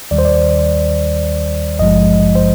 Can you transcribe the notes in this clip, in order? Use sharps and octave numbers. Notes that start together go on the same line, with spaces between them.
D#2 D#3 G3 D5
C5
D5
G#1 G2 F3 G#3 D#5
C5